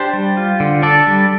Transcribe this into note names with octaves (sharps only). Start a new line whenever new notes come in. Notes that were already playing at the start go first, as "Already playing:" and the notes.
Already playing: D4 G4 C5
G3
F4
D3
D4 A4 D5
G3